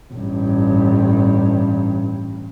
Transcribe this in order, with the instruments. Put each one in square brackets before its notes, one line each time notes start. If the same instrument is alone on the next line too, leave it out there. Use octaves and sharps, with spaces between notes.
[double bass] A1 G2